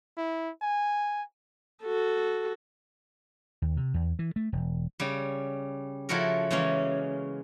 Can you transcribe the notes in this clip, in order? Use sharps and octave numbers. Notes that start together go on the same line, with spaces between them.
E4
G#5
F#4 A4
D#2
C3
E2
E3
A3
E1
C#3 G3
C#3 F3 E4 F#4 A4 A#4
C#3 E3 G#3 A#3 C#4